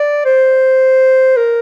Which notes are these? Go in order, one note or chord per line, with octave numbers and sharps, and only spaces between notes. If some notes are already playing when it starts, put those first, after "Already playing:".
Already playing: D5
C5
A#4